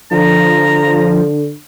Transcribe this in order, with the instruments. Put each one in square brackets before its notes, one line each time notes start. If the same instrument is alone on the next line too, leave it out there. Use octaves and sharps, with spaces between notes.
[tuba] D3 [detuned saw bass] F3 [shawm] A#5